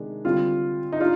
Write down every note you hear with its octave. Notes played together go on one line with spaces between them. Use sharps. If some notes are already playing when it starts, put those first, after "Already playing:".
Already playing: C3 D#3 G#3 D4
D3 G3 C4 F4
D#4
D4 F4